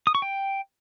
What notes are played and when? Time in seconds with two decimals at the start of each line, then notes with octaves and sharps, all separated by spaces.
0.07 D#6
0.15 C#6
0.22 G5